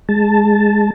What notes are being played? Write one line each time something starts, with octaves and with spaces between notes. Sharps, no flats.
G#3 A5